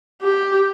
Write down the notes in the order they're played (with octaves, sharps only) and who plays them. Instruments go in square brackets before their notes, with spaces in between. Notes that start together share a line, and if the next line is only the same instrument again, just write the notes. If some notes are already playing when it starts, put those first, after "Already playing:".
[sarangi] G4